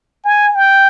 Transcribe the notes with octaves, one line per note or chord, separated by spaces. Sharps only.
G#5
G5